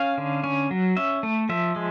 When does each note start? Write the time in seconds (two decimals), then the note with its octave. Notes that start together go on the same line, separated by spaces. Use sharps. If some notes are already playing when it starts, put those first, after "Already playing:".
Already playing: C#4 F5
0.18 D3
0.44 C#4
0.71 F#3
0.97 C#4 E5
1.23 A3
1.49 F3 E5
1.76 G#3